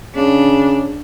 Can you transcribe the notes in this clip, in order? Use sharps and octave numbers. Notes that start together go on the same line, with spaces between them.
C#3 D4